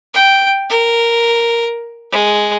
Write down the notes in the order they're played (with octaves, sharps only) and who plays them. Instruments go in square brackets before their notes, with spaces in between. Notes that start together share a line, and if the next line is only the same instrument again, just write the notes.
[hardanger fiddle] G5
A#4
G#3